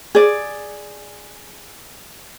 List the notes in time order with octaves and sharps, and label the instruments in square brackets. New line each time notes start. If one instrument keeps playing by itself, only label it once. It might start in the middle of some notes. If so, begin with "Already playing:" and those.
[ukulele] G#4 D5